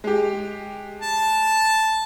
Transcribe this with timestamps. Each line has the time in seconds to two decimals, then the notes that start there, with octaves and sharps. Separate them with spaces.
0.04 G#3 G4
1.02 A5